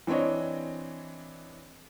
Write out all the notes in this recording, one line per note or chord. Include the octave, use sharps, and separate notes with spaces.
E3 C4 D4 C#5 D#5